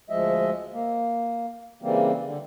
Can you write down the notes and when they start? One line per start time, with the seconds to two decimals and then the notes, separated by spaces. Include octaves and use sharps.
0.10 D2 F3 G#3 D#5 E5
0.72 A#3
1.82 C#3 E3 G3 A#3 C4
2.24 D3